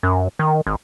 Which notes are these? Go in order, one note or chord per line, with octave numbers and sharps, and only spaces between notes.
F#2
D#3
G#1